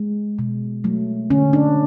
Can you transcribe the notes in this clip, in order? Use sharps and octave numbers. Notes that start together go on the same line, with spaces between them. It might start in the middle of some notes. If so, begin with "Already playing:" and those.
Already playing: G#3
B2
F#3 A3
D3 C#4
D4